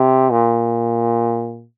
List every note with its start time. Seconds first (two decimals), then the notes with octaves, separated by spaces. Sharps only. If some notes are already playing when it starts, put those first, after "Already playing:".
Already playing: C3
0.31 A#2